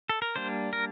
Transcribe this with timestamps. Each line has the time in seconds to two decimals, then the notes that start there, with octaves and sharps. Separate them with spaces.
0.09 A4
0.22 A#4
0.36 G3 A#3 D4 C5
0.73 A#4